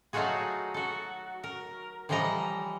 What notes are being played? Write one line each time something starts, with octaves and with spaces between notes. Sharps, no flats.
F#3 A3 D#4 F4 F#4 G#4
F#4 A4
A#4
A2 E3 F3 G3 D#5 A#5